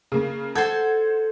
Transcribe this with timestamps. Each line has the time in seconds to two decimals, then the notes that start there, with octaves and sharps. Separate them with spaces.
0.12 C#3 A#3
0.55 A4 C5 F#5 G6 G#6